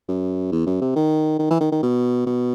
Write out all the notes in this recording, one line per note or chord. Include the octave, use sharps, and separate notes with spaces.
F#2
E2
F#2
C3
D#3
D#3
E3
D#3
D#3
B2
B2